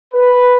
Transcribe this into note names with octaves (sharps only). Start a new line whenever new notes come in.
B4